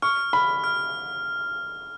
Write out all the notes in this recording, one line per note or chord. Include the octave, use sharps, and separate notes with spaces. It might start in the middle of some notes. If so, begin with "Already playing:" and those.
C#6 F6
B5 F6
F6